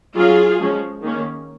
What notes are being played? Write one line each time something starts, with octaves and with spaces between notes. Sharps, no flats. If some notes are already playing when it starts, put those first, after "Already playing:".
F#3 C#4 F4 G#4
F3 G#3 C#4
D#3 A#3 C#4